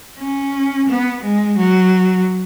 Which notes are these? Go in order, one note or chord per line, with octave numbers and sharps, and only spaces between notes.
C#4
B3
G#3
F#3